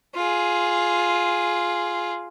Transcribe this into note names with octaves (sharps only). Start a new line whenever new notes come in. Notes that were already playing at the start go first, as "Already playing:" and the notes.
F4 G#4